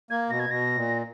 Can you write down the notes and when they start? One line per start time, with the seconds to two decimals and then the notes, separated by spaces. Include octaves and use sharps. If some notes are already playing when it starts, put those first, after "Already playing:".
0.10 A#3 G#6
0.30 B2 A#6
0.40 G#6
0.49 B2 A#6
0.76 A#2